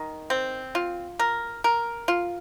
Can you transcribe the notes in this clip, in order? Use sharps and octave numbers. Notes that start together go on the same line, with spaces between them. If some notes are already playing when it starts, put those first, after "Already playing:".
Already playing: D#3
C4
F4
A#4
A#4
F4